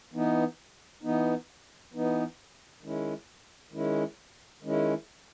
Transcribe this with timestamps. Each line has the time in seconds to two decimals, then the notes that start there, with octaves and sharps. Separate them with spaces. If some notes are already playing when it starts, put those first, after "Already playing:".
0.13 E3 B3 D#4
1.03 E3 B3 D#4
1.93 E3 B3 D#4
2.82 D#3 G#3 C#4 E4
3.72 D#3 G#3 C#4 E4
4.62 D#3 G#3 C#4 E4